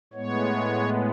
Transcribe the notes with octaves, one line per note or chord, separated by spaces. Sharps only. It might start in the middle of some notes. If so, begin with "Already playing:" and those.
A2 G#3 B3 C#5